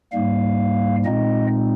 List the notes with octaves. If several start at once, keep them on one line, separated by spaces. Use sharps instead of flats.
G#2 G3 A#3 F5
A#2 G#3 C4 D#4 D#5